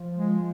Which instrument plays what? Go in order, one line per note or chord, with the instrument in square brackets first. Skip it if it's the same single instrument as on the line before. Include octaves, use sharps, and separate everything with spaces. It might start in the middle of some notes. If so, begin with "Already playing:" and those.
Already playing: [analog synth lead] F3
[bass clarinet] G#3